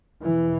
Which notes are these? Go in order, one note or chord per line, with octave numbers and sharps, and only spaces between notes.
E2 B2 E3